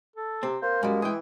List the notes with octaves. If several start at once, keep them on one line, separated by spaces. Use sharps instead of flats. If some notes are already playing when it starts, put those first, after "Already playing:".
A4
C3 C4
A#3 C5
F#2 G3 G#3
E3 G#4 G5